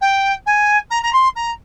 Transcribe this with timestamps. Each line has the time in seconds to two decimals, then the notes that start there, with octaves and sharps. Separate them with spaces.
0.01 G5
0.46 G#5
0.90 A#5
1.03 A#5
1.12 C6
1.35 A#5